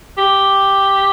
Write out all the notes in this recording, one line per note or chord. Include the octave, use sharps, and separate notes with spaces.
G4